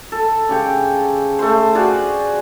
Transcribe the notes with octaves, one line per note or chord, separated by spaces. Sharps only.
A4
C#3 G4 C#5 G5
A3 C5
F#4 G#4 D5 F5